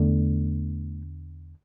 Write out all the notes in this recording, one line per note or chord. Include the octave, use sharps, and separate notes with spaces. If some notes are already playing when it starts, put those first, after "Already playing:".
Already playing: E2 D3 A3